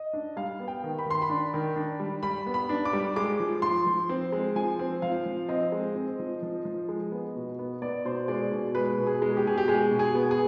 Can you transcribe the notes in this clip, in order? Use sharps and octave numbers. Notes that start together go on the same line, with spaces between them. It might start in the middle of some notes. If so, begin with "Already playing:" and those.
Already playing: D#5
D4
G3 F5
B3
G5
D#3
B5
D#3 C6
B5
D4
D#3
D4
G3
G3 B5
B3
B5
D4
D6
G3
G#3 D6
F3
F3 C6
F3
C4
G#3
F3 G#5
C4
F3 F5
F3
C4 D#5
G#3
C4
F3
F3
F3
G#3
B3
B2
B3
B3 D5
B2 C5
G#3 D5
B2
G#3 B4
B2
G#4
G#3
G4
B2 G#4
G4
G#3 G#4
B2
G#4
B3
G#4